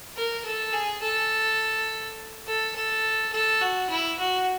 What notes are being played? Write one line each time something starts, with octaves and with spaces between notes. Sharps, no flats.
A#4
A4
G#4
A4
A4
A4
A4
F#4
E4
F#4